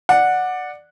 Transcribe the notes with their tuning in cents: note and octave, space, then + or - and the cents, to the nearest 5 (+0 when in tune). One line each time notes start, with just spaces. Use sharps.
D5 +10 F#5 -10